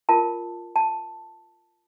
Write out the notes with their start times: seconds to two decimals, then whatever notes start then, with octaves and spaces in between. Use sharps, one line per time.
0.09 F4 A#4 A5
0.76 A5